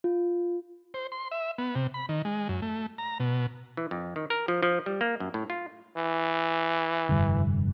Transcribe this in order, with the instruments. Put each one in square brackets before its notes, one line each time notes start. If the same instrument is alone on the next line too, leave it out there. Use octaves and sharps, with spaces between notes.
[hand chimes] F4
[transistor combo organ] C5
C6
E5
B3
C3
B5
D#3
G#3
F#2
A3
A#5
B2
[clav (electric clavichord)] E3
F2
D#3
A#4
F3
F3
G3
A#3
F#2
A2
F4
[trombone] E3
[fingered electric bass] F1 G2 D3